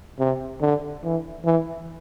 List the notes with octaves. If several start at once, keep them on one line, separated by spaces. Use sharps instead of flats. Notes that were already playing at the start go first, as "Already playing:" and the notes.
C3
D3
E3
E3